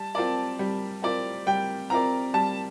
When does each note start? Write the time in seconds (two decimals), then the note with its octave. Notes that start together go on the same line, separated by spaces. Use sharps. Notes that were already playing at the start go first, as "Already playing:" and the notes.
Already playing: G3 A5
0.15 C4 F4 A#4 D5
0.59 G3
1.02 C4 F4 A#4 D5
1.46 G3 G5
1.90 C4 F4 A#4 D5 A#5
2.34 G3 A5